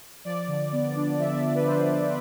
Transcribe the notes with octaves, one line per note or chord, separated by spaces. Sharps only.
F3 D5
D3
B3
D4
F3 E5
D3
B4
B3 C5
D4